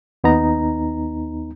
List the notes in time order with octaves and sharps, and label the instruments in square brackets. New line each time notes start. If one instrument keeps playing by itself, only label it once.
[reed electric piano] D#2 B3 D#4 A#5